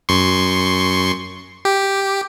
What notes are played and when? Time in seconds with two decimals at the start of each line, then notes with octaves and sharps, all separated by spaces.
0.09 F#2 C6 C#6
1.65 G4